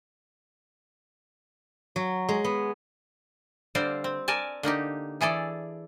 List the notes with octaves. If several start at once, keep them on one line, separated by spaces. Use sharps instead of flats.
F#3
G#3
B3
D3 G3 C4 C5 D5 F5
C4
A#4 D5 G#5 A5
D3 A#3 D#4 G4
E3 G#4 A4 D5